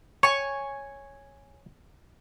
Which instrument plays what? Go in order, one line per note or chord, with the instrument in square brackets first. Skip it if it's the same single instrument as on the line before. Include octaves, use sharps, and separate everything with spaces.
[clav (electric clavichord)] C#5 [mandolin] G#5 C#6